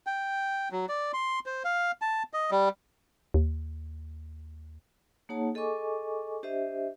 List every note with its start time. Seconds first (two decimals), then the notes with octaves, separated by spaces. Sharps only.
0.07 G5
0.71 F#3
0.89 D5
1.14 C6
1.46 C5
1.64 F5
2.02 A5
2.33 D#5
2.51 G3
3.34 D#2
5.29 A#3 D#4 G#4 C#5 F#5 A5
5.54 G#4 A4 D#5 G#5 C#6 D6
6.43 D4 G4 C5 D#5 E5